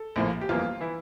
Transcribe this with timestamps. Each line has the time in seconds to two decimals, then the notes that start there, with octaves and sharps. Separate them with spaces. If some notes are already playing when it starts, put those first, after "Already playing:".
Already playing: A4
0.16 A#1 A2 F3 A#3
0.41 G4
0.49 G1 F2 E3 A#3 F4
0.81 E3 E4